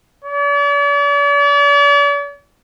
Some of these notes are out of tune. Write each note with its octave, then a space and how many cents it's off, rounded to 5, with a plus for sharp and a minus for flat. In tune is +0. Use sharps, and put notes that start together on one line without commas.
D5 -45